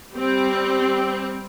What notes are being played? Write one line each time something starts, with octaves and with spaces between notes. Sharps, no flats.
G3 C4